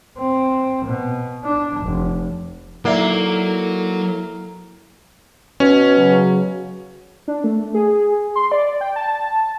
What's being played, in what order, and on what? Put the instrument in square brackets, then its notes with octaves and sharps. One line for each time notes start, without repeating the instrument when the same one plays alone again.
[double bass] C4
B2
D4
F1
[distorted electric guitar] F#3 [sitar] A#3 [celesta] D#4 D5 E5 [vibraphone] E4 A4
[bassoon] B2 [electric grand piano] C#4
[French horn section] C#3 F#3
[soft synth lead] D4
A3
G#4
C6
D5
G5
A5